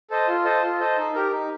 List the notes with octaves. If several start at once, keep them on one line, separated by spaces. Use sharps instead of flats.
A4 C5 D#5
F4
A4 C5 D#5
F4
A4 C5 D#5
D#4
G4 A#4
D#4